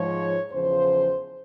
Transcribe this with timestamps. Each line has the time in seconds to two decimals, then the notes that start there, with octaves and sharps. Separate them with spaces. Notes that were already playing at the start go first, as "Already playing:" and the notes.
Already playing: G#2 F3 C#5
0.51 E2 C#3 F3 C5